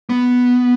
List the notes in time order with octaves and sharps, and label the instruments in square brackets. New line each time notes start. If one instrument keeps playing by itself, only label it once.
[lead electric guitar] B3